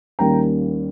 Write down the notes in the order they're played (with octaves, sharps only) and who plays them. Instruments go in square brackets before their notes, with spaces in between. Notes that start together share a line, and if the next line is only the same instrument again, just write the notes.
[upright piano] D#2 D#3 G3 A#3 C#4 G5 A#5